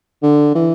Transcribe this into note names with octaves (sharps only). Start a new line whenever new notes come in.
D3
E3